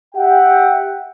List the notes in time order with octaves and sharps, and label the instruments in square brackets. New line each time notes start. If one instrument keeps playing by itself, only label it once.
[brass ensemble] G4 E5 F#5 G5